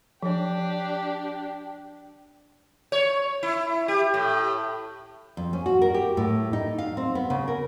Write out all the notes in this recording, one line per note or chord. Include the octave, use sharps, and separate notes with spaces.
F3 D4 G4 C#5
C#5
E4
G4
A2
F2
C#4
F#4
A#4
G4
A2
D#4
F5
C4
B3
C#3
A#4